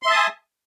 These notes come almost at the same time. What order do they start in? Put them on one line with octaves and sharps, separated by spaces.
C6 E5 A5 D#6 G#5